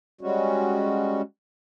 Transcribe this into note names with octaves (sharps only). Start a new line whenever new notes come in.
G3 G#3 C#4 F#4